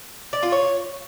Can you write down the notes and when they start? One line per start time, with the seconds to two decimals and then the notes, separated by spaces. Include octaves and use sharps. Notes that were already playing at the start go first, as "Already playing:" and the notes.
0.33 D5
0.43 F4
0.52 C#5